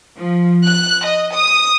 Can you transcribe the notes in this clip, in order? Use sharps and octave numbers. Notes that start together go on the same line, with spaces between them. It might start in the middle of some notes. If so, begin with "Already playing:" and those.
F3
F#6
D#5
D#6